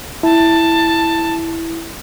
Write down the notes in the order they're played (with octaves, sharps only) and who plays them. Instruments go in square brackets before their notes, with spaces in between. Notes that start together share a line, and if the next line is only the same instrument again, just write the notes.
[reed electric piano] E4 [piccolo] A5